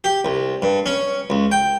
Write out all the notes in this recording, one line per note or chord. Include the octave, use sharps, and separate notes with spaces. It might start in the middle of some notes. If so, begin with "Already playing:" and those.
G4
C2
G2
C#4
C#2
G5